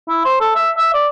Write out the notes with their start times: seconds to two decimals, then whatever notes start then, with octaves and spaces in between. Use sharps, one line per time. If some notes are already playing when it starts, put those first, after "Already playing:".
0.08 E4
0.25 C5
0.40 A4
0.55 E5
0.77 E5
0.94 D5